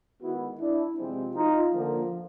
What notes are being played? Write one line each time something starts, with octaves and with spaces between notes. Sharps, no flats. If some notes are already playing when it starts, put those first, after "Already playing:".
D#3 G#3 B3 E4 F#4
D4 E4
C3 F3 G#3 C4
D#4 F4
D3 F3 A#3